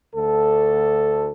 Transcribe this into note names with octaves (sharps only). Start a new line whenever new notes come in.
D2 A4